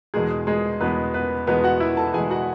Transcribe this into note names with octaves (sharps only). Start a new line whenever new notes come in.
E2 B2 G#3 G#4
G#3 G#4
E2 B2 G#3 B3 B4
B3 B4
E2 B2 G#3 B3 B4
F#4 F#5
E4 E5
A4 A5
E2 B2 G#3 G#4 G#5
F#4 F#5